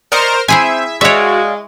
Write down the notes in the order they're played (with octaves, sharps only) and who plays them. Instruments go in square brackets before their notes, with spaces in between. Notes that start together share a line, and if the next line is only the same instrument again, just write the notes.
[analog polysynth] A#4 C5 F6 [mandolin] D5 D#5 C#6
[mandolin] C4 [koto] E4 G#4 G#5 [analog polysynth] E5
[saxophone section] G#3 [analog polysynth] F#4 [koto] C#5 E5 [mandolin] D5 F5